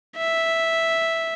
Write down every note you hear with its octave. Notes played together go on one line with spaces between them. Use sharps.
E5